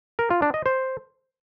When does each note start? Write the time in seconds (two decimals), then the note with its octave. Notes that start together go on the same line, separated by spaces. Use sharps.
0.19 A#4
0.31 F4
0.42 D4
0.54 D#5
0.66 C5